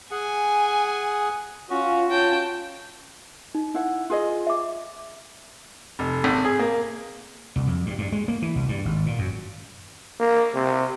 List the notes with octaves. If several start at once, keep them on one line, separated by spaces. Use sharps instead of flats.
G#4 F#5 G#5
C#4 F4 F#4
C#4 F4 G5 A5
D#4
E4 F#5
F4 G#4 D#5
E5 D6
F1
G#1
G#4
A#3
C2
F2
G2
G2
G#3
A#3
E3
C2
G2
G#1
A#2
F#2
A#3
C3